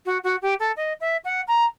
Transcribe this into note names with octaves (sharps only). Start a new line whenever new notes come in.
F#4
F#4
G4
A4
D#5
E5
F#5
A#5